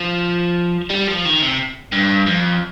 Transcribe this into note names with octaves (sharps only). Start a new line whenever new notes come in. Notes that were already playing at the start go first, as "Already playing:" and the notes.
Already playing: F3
G3
F3
D#3
C3
G2
F2